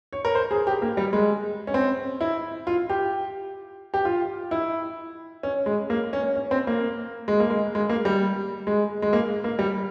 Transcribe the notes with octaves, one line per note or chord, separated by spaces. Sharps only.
C#5
A#4
C5
G#4
G4
A#3
G3
G#3
C#4
C4
E4
F4
G4
G4
F4
E4
C#4
G#3
A#3
C#4
C#4
C4
A#3
G#3
A#3
G#3
G#3
A#3
G3
G#3
G#3
A#3
A#3
G3